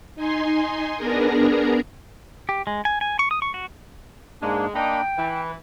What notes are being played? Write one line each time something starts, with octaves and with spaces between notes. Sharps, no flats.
D#4 G#5 C6
B3 D4 G#4 A#4 A#5
G4
G#3
G#5
G#5
C#6
D#6
C#6
F#4
G#2 G#3 A#3 D4
A#3 D4 D#4 G5 B5
E3 B4